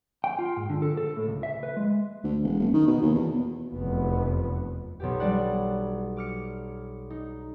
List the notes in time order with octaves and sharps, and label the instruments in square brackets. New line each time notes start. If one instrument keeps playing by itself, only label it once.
[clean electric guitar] G5
F4
G#2
D3
A4
A4
A2
C#2
E5
B4
G#3
[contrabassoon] D2
E1
F#1
D#3
B2
D#2
E2
B2
[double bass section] F1 E2 B3
[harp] B1 B2 G4
F#3 G3 D4 D5 F#5
D6 F6 C#7
D#4